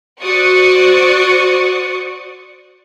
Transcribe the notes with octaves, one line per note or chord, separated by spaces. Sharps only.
F#4 C5 D5 C#6 D#6